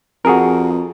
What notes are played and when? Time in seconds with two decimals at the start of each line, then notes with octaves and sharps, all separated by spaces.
0.25 F2 F#4 G#4 A#4